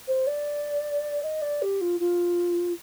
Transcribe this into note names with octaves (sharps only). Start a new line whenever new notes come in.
C5
D5
D#5
D5
G4
F4
F4